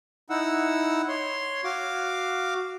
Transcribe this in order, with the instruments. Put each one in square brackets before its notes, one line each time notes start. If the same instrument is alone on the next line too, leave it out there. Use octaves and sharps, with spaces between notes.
[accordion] D#4 E4 F#5 E6
C#5 C6
F#4 F5 D6